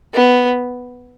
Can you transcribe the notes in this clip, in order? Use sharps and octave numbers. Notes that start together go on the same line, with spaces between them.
B3